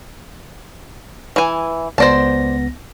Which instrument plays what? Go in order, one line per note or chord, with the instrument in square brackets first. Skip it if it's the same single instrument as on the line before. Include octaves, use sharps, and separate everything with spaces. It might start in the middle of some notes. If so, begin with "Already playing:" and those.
[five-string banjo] E3 G#5
[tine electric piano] C#2 B3 A#6 [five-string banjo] C5 D5 A5